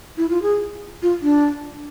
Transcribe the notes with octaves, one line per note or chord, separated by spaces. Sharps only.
E4
F4
G#4
F4
D4